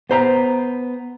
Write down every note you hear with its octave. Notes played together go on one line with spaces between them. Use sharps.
B3 C5 A#5